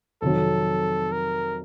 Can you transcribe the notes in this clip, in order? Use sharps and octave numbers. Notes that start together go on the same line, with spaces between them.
F2 C3 D#3 F#3 A4
A#4